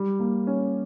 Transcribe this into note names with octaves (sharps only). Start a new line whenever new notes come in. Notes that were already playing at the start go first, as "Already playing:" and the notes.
Already playing: G3
A#3
C#4